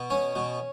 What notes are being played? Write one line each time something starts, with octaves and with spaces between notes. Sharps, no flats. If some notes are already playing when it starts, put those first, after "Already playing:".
Already playing: B2
C#4
B2